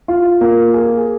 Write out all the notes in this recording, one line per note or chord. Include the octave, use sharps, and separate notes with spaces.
F4
A#3
G#4